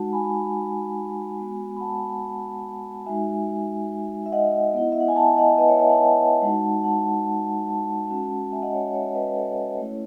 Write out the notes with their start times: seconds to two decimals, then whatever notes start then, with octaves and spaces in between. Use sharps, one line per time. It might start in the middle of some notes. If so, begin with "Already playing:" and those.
Already playing: G#3 D#4 F#4 F#5 A5
0.13 G#5 B5
1.38 G#3 B3 F#4
1.77 B5
1.81 F#5 A5
3.06 G#3 D#4 F#4 E5 G#5
4.26 E5
4.32 D#5 F#5
4.74 B3 E4
4.92 E5
5.00 F#5
5.08 G#5
5.16 F#5 A5
5.38 D#5 F#5
5.58 B4 D#5
5.69 C#5 E5
5.79 E5 G#5
5.90 F#5 A5
6.42 G#3 D#4 F#4
6.84 F#5 A5
7.68 F#5 A5
8.10 G#3 C#4 F#4
8.52 E5 G#5
8.62 D#5 F#5
8.73 C#5 E5
8.94 C#5 E5
9.15 B4 D#5
9.36 A4 C#5
9.78 A3 C#4 E4